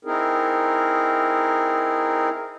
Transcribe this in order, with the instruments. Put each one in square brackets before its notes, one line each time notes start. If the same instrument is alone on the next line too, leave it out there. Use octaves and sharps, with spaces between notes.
[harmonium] C4 D#4 E4 G#4 A#4